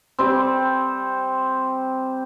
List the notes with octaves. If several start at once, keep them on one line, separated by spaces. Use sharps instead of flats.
G3 C4